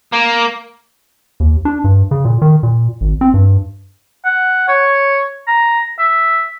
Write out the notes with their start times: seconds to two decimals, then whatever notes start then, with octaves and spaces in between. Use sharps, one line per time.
0.12 A#3
1.40 D#2
1.65 D4
1.84 G2
2.11 C#3
2.25 A#2
2.42 D#3
2.63 A#2
3.01 G#1
3.21 C4
3.34 G2
4.25 F#5
4.68 C#5
5.47 A#5
5.99 E5